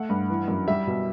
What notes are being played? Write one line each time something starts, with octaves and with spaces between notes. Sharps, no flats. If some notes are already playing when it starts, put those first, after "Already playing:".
Already playing: A3 F#5
G2
E3
F#2
G3 E5
B2